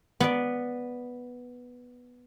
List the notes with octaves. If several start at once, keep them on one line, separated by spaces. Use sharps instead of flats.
B3 D5